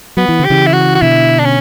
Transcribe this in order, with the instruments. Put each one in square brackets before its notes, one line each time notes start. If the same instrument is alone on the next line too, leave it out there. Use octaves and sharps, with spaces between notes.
[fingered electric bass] F#3 [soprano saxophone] B3
[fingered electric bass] E3
D3
[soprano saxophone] G4
[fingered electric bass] C#3 E3
[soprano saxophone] E4
F#4
F#4
[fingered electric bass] B2 D3 [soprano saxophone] E4
[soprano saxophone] D4
C#4